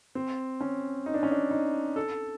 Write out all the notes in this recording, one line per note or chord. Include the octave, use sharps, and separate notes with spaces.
C4
C#4
D#4
D4
C#4
D4
D#4
A4